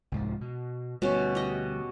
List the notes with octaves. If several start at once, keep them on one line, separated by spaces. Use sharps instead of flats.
C2 G#2 F3
B2
D2 B2 G3 C#4
G4 D#5